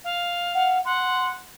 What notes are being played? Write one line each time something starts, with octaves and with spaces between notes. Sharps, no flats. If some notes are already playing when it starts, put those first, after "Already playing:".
F5
F#5
F#5 C6